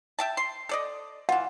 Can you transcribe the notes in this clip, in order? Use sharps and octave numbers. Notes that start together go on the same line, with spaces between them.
E5 G5 A5
C6
A4 D5 D#5
E3 F4 F#5